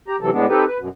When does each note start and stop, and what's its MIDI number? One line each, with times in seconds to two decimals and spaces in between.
0.08 0.16 67
0.08 0.16 82
0.21 0.30 48
0.21 0.30 52
0.21 0.30 54
0.21 0.30 69
0.32 0.46 45
0.32 0.46 56
0.32 0.46 59
0.32 0.46 62
0.49 0.64 60
0.49 0.64 63
0.49 0.64 67
0.49 0.64 69
0.49 0.64 71
0.67 0.78 71
0.79 0.88 42
0.79 0.88 47